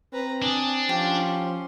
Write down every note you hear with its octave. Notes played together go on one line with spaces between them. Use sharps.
C4 B4 A#5
D4 G#5 D#6
F3 C#4 G4 C6